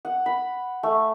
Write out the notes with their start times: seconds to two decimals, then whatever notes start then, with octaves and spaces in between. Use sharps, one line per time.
0.05 F#5
0.26 B5
0.83 A3